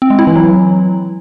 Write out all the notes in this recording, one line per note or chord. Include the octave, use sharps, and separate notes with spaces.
C4
G#3
E4
E3
F#3